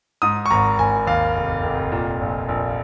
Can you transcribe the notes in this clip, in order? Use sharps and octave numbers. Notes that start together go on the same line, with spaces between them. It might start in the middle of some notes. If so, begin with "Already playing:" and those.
G#2 D#6
C#6
G#1 A#5
G#1 G#5
D#2 F5
F1
F1
A#2
A#1
A#1